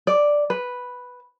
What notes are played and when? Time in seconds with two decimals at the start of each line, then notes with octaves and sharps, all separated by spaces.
0.07 D5
0.50 B4